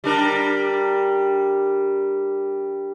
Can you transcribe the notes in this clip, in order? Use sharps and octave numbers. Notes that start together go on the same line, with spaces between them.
G3 D4 A#4